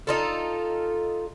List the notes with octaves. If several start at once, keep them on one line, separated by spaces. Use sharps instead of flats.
D#4 F4 A4